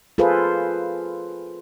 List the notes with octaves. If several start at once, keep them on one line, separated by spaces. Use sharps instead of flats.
F4 G#4 A4 B4 C5